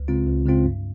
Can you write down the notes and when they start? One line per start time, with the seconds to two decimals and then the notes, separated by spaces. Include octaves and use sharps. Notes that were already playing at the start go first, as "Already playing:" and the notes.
Already playing: C#2
0.08 C#3 G#3 C4 F4
0.27 C#2
0.46 C#3 G#3 C4 F4
0.65 G2